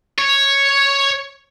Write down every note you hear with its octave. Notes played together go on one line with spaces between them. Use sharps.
C#5